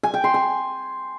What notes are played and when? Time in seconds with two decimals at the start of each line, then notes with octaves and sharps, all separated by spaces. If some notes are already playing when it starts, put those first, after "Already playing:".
0.03 G#5
0.14 G5
0.24 C6
0.34 G#5